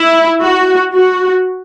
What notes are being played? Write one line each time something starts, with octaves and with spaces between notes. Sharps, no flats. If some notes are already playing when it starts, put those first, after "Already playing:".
Already playing: E4
F#4
F#4